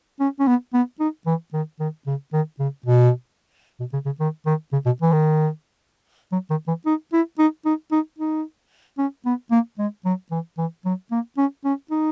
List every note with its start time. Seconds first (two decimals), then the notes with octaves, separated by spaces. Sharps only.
0.20 C#4
0.39 C#4
0.47 B3
0.73 B3
0.99 D#4
1.26 E3
1.53 D#3
1.80 D#3
2.06 C#3
2.33 D#3
2.59 C#3
2.86 B2
3.80 B2
3.93 C#3
4.05 C#3
4.20 D#3
4.46 D#3
4.72 C#3
4.86 B2
5.02 E3
5.12 D#3
6.32 F#3
6.50 D#3
6.67 E3
6.86 D#4
7.13 E4
7.38 D#4
7.65 D#4
7.91 D#4
8.18 D#4
8.98 C#4
9.25 B3
9.51 A#3
9.78 G#3
10.05 F#3
10.31 E3
10.58 E3
10.85 F#3
11.11 A#3
11.37 C#4
11.65 C#4
11.90 D#4